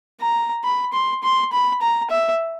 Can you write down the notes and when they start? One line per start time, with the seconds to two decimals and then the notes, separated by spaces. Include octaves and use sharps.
0.21 A#5
0.64 B5
0.93 C6
1.23 C6
1.52 B5
1.82 A#5
2.10 E5